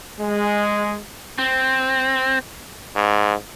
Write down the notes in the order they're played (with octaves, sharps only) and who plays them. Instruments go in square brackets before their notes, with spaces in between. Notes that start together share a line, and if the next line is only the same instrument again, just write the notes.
[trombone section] G#3
[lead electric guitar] C4
[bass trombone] G#2